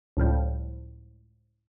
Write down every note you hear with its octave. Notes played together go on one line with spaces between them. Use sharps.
C#2 A2 F3 G3